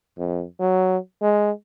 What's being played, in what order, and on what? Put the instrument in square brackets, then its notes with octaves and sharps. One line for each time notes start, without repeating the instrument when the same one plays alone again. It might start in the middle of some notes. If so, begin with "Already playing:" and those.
[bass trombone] F2
F#3
G#3